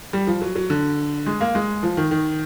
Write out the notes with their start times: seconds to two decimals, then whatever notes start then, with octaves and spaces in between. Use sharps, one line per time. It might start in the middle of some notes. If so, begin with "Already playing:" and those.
0.13 G3
0.27 F3
0.41 F#3
0.55 F#3
0.70 D3
1.26 G#3
1.41 A#3
1.55 G#3
1.83 F3
1.97 D#3
2.11 D#3